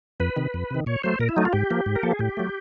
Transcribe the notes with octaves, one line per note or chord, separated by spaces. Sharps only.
F2 B4
C3 D#3
F2
C3 D#3
A#2 C#5
F#3 A3 C5
A#2 A#4
E4
F#3 A3 D#4
F4
G#2 G4
F3 A#3
G#2
A#4
F3 A#3 A4
G#4
A2 G4
F#3 A3